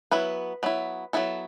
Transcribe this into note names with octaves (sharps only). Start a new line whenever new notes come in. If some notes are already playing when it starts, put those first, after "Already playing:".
F#3 B3 E4 B4
F#3 B3 E4
F#3 B3 E4 A4